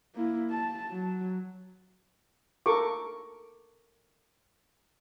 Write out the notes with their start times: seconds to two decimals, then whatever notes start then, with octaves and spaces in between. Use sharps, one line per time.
0.15 A#3 E4
0.51 A5
0.91 F#3
2.66 A4 A#4 C#6 D6